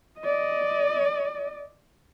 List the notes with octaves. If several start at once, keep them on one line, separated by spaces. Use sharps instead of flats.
D5 D#5